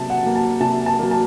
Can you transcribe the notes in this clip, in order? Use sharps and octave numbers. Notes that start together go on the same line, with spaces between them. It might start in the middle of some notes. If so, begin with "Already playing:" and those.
Already playing: C3 F#3 A#3 A5
F#5
F#3 A#3
A5
C3 A5
A5
F#3 A#3
A5